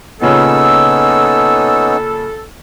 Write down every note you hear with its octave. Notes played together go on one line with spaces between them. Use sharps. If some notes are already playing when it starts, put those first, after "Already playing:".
A#2 C#3 B3 C#4 D#4 A4 E6